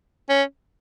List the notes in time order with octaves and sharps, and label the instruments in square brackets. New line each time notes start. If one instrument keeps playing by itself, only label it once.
[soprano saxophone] C#4